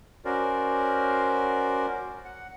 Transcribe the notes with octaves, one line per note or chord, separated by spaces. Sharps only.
C#4 F#4 A#4 C5 D5
F#5